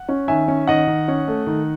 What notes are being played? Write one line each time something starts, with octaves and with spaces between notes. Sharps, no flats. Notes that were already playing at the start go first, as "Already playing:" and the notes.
Already playing: F#5
C#4
D#3 E5 G#5
C#4
D#3 D#5 F#5
D#3
C#4
A3
D#3